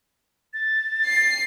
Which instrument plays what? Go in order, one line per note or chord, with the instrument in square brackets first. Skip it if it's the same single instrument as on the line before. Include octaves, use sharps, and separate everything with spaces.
[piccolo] A6
[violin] C7